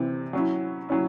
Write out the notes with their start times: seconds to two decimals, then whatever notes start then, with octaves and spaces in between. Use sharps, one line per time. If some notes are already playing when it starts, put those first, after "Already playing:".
Already playing: C3 E3 C4
0.33 F#3 C#4 E4
0.89 F#3 C#4 E4